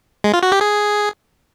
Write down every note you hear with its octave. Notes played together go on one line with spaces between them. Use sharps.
G#3
F4
F#4
G4
G#4